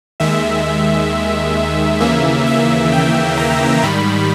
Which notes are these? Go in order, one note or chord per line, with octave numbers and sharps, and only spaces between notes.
D#2 D#3 G#3 E5
D#2 C#3 E3 A#3 E5
E5
G5
A#5
G#2 D#3 G3 B5